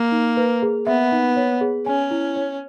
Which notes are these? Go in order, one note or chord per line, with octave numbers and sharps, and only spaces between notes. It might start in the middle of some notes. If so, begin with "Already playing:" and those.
Already playing: A#3
D#4
B4
G#4
B3 E5
D#4
C#5
G#4
C#4 G#5
E4
C#5